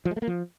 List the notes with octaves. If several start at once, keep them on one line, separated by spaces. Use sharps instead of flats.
F3
G#3
A3
A#3
F3